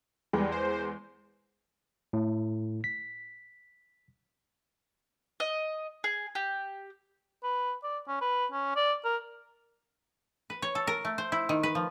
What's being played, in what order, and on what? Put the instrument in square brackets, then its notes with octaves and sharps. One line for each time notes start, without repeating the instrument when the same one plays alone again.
[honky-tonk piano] E2 G#3 [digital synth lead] G3
[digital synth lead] C5
[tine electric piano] A2
B6
[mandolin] D#5
G#4
G4
[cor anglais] B4
D5
C#4
B4
C#4
D5
A#4
[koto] B4
C#5
A4
A#4
A3
C5
E4
D#3
B4
F3